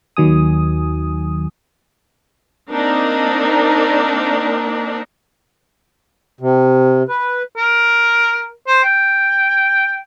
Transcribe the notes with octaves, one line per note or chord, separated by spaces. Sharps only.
D#2 D#3 F#3 G#5 D#6
A#3 C4 D4 D#4 A#4
C3
B4
A#4
C5
G5